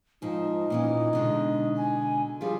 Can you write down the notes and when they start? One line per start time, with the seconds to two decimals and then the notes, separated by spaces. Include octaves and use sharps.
0.22 G#2 F3 D#4
0.70 A#2 E3 C#4
1.13 B2 D3 G#3
1.77 G#5
2.41 F3 G3 F4 G#4